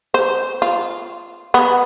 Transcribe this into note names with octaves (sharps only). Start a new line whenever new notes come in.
C5
F4
B3